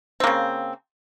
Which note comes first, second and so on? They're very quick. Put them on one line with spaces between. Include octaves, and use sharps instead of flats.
C4 A#3 C#3